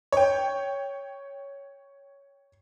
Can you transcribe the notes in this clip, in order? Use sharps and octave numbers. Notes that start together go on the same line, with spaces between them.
C#5 G5